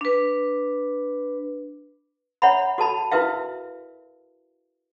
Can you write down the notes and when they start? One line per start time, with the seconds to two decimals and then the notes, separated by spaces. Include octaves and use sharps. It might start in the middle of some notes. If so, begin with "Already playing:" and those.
0.01 D4 B4
2.42 C#5 E5 F#5 A#5 B5
2.78 F#4 A4 A5 B5
3.11 E4 F#4 A#4 B4 E5 F5